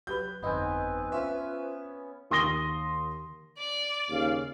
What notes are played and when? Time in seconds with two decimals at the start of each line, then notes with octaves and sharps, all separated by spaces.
0.07 F#3 G4 B4 G6
0.42 G1 F2 B3 C4 D#4 B4 G#5
1.12 C#4 F4 C5 E5
2.31 D#2 C6 D#6 A#6 G7
3.58 D5
4.10 D#2 C#3 F5